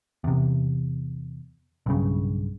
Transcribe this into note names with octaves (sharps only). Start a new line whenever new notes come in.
E2 C3
B1 G2 C#3